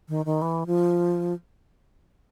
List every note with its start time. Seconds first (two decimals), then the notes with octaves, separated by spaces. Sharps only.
0.09 D#3
0.26 D#3
0.42 E3
0.67 F3